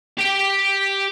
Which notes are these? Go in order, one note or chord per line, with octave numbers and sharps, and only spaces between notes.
G4 G5